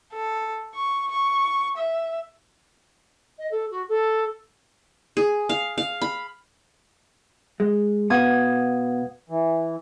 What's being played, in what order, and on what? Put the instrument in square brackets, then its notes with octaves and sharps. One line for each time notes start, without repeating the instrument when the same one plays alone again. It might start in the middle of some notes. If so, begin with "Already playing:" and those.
[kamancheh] A4
C#6
C#6
E5
[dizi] D#5
A4
F#4
A4
[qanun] G#4
F5
F5
B5
[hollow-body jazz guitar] G#3
[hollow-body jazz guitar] B2 [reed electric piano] B4 F5 F#5 [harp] D#6 G#6
[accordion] E3